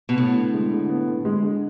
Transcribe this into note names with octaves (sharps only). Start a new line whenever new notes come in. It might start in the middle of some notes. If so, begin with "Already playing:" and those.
B2
A2 B3
D3
G#3
D3
B3
D3
G#3
D3